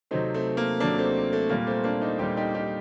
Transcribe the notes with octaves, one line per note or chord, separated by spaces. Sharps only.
C3 F#3 A3 C4 D#4
A3 C4
A#3
C3 F#3 A3 A#3 D4
A3 C4
A3
A#2 G3 A#3
A3 C4
A#3 D4
C4 D#4
A#2 G3 D#4 G4
D#4 G4
D#4 G4